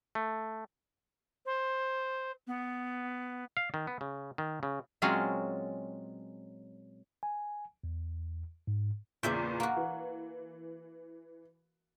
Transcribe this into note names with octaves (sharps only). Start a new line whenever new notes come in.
A3
C5
B3
F5
D#3
B3
C#3
D#3
C#3
A#2 F#3 G#3 C4 C#4 F4
G#5
E2
G#2
E2 A#2 C#3 D5 E5 G5
A#3 F#4
E3